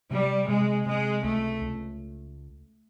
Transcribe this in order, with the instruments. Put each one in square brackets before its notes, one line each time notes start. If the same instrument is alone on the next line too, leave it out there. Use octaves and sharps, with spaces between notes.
[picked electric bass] C3 [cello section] G3
[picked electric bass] C3 [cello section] G#3
[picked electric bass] C3 [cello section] G#3
[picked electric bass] C#2 [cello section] A3
[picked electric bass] C#2